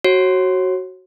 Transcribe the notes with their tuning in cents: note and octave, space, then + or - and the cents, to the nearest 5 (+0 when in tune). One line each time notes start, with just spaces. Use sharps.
F#4 +10 C#5 -35